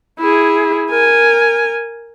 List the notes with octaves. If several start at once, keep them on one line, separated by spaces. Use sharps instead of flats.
E4 G#4
A#4 G#5